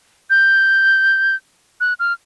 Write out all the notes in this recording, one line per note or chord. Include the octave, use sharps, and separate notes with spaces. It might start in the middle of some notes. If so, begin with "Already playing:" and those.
G6
F#6
F6